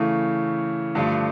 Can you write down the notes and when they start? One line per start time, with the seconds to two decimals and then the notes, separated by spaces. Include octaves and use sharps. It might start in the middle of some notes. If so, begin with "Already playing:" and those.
Already playing: C#3 E3 A3 C#6
0.95 G2 D3 F3 A3